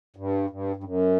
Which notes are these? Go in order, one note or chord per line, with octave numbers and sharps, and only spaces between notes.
G2
G2
G2
F#2